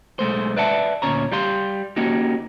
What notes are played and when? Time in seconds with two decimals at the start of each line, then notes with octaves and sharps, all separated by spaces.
0.19 B1 G#3 A3 C5
0.56 B4 D5 E5 F#5 A5
1.02 D2 A#2 C#4 C#5 A#5
1.32 G3 G4 F5 C6
1.97 A#3 C#4 D#4 F#4 G4